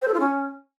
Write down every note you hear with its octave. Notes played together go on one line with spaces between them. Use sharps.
C5
A4
F4
C#4